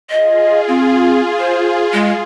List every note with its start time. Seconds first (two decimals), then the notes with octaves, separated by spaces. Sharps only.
0.10 F4 G#4 D#5
0.68 C4
1.39 C5
1.93 G#3